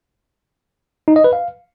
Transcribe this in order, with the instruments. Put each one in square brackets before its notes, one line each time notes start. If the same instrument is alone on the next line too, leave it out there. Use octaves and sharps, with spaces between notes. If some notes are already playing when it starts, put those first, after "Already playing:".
[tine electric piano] D#4
D#5
B4
F5